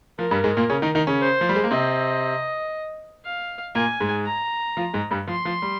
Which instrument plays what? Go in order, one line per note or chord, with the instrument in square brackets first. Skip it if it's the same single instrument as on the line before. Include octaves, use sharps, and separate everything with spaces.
[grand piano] F3 [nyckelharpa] A#4
[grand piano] G2 G3
G#2 G#3
A#2 A#3
C#3 C#4
D#3 D#4
D#3 D#4
C#3 C#4
[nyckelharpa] C5
[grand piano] F3
G3
G#3
A#3
[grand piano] C3 C4 [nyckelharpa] D#5
[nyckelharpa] F5
[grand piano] A#2 A#3 [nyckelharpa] G#5
[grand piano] G#2 G#3
[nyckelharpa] A#5
[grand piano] F3 F4
G#2 G#3
G2 G3
[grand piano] F3 [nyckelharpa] C6
[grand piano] F3
G3